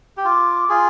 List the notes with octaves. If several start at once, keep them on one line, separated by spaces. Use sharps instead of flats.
G4
F4 D6
F4 G#4 C6